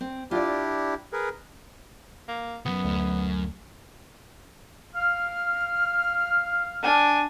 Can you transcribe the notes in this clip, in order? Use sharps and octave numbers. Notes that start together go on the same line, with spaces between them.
C4
D4 E4 F4 G4 D5
G#4 A#4 B4
A#3
C#2 F#2 B3
D2 A3
F5 F6
D4 G#5